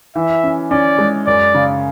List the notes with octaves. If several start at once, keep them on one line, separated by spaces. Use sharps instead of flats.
E3 E5
C#4
C#4 D5
G#3
F#2 D5
C#3